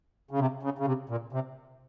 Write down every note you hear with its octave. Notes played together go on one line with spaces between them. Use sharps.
C#3
C3
C#3
C#3
C3
A#2
C3